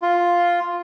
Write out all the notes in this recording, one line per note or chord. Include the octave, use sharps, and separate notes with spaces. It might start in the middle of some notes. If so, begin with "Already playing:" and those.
F4